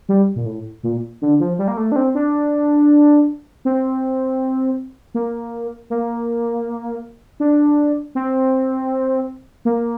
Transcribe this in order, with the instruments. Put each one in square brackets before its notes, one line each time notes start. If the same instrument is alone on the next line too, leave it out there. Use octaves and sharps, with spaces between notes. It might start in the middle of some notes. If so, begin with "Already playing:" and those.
[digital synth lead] G3
A#2
A2
A#2
D3
F3
G3
A#3
A3
D4
C4
D4
C4
A#3
A#3
D4
C4
A#3